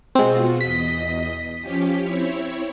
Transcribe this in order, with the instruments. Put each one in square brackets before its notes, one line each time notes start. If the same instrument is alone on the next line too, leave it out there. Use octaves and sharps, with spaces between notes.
[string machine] B2 F4 F#4 [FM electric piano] G#3 C4
[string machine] E2 D#5 [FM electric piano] B6
[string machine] F3 C#4 G4
C4 E4 C#5